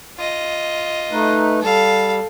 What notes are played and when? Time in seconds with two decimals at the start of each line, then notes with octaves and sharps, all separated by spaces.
0.17 F4 D#5
1.11 A3 D#4 B4
1.61 G3 A4 F5